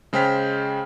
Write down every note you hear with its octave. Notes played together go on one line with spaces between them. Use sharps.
C#3 G#3 C5 G5 F6 B6